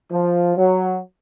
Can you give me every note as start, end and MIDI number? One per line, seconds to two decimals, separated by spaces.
0.12 0.52 53
0.56 0.98 54